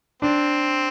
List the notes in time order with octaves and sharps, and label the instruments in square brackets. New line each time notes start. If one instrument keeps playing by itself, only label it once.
[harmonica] C4 [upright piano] D4